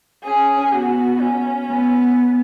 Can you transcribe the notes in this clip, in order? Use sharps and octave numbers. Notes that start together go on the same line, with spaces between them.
C#4 G#4
B3 F#4
C#4
B3